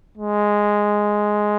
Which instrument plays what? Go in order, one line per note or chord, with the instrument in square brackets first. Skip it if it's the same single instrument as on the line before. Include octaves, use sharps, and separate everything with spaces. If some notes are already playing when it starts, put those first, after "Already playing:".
[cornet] G#3